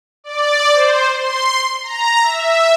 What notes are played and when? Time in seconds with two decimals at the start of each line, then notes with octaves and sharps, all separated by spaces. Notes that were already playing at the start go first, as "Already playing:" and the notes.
0.24 D5
0.73 C5
1.16 C6
1.83 A#5
2.23 E5